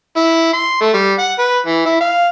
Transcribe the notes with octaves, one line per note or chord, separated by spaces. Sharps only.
E4
C6
A3
G3
F#5
B4
E3
E4
F5